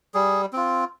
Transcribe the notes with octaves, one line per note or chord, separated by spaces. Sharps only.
G3 G#4
C4 F4